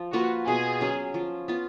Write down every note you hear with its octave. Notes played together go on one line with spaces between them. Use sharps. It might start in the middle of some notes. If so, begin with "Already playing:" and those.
Already playing: F3
A#3 F4 F#4 B4
B2 G#4
F#3 C#4
F3
B3 F4